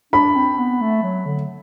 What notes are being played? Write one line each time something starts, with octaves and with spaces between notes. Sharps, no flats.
D4 B5
C4
B3
A3
F#3
D3